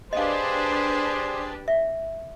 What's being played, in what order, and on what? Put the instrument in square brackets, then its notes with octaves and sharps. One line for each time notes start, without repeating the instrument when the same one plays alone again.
[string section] D4 G4 B4 [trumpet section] G#4 C5 [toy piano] D#5 F5
[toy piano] E5